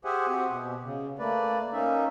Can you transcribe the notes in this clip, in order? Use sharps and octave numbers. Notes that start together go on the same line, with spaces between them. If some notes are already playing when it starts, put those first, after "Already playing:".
G4 G#4 C5 E5 F#5 G#5
C4 F#4 G4 F#5
B2
C#3
A3 A#3 B4 D5
A#3 C#4 D#4 E5